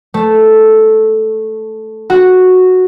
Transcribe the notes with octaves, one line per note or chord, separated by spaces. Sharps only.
A3
F#4